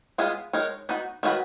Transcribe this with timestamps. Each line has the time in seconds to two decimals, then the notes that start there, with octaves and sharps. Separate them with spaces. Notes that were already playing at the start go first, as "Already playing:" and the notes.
0.18 G#3 B3 F4 G#4
0.53 G#3 D#4 A#4 C#5
0.89 B3 D#4 F#4
1.23 D#3 F#3 C#4 F#4 B4